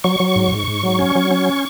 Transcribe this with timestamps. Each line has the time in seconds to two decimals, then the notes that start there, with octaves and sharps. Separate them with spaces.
0.04 F#3 C#6
0.20 F#3
0.36 G#2
0.52 G#2
0.68 G#2
0.83 F#3
0.99 C#4
1.15 F#3
1.31 C#4